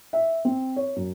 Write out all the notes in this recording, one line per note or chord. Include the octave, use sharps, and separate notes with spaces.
E5
C4
C#5
F#2